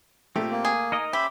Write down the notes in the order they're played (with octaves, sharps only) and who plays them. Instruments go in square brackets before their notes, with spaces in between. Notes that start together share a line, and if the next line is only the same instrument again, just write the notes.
[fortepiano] A#2 A3 [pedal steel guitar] C4 G4
[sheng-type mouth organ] A#3
[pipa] G#4
[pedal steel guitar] D#4 A#4 D#5
[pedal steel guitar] C#4 C5 [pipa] G4 [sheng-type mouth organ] E5 B5